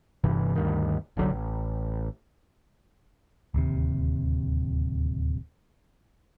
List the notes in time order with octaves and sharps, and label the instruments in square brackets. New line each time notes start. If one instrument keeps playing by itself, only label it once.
[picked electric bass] G1 G2 C3 E3
D2 G2 D#3
F#1 C2 D3 F#3
A1
D1 D#2 C3